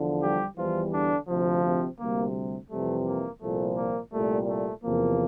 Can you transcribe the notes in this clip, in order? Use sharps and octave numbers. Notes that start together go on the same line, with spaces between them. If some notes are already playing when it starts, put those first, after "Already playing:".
Already playing: E2 D3 F3
G3 G4
E2 E3 F3 G3 F4
D3 D4
D2 C3 F3
C3 C4
D2 C3 G3 A#3
F2 C3 E3 G3 A3
A#3
C2 A#2 F3 A3
A#3
C2 A#2 G3 A3
A3
E2 C3 F3 A#3